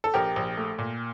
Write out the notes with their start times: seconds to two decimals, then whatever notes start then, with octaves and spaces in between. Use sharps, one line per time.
0.04 A4
0.14 A#1 G4 A#4
0.36 A#1
0.57 A3
0.79 A#2